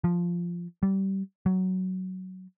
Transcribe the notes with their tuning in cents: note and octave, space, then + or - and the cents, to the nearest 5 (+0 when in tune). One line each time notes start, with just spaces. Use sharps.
F3 -5
G3 -20
F#3 +10